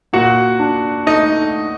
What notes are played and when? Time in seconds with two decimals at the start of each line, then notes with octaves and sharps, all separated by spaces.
0.13 A#2 F#4 F#5
0.59 D4
1.06 A3 D#4 D#5